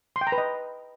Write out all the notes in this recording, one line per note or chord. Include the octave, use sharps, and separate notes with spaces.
C6
G5
A#5
B4
D#5